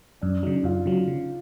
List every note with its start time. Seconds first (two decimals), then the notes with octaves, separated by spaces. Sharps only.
0.21 F#2 D4
0.43 C#3 F#3 D#4
0.64 F#2 F4
0.86 C#3 F#3
1.08 C#3